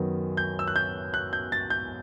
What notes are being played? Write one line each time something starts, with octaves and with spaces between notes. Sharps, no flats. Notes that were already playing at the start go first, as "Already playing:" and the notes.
Already playing: F#2 D#3 F#3 B3
G6
E6
F#6
G6
F#6
G6
A6
G6